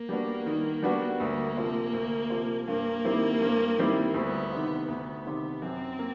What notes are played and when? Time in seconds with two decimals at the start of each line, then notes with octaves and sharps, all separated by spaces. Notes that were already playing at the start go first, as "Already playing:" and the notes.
Already playing: A#3
0.09 G3 B3 D4 F#4
0.46 D#3
0.83 G3 B3 D4 F#4
1.20 D2 A#3
1.57 C3 F3
1.93 D2
2.30 C3 F3
2.67 G2 A#3
3.04 D#3 G3 C4 E4
3.42 G2
3.77 D#3 G3 C4 E4
4.14 D2 B3
4.52 C3 D#3
4.88 D2 B3
5.26 C3 D#3
5.62 F#2 C4
5.99 A#3